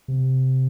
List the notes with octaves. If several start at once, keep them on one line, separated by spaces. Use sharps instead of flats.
C3